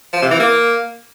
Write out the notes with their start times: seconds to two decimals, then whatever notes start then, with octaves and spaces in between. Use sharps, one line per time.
0.13 F3
0.22 C3
0.31 E3
0.40 A#3